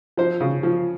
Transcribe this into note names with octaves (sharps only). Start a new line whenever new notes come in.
F3 C5
C#3
F3